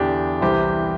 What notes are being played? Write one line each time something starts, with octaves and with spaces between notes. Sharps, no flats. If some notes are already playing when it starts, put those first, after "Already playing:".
Already playing: E2 D3 D4 G4
C2 C3 E3 G4 C5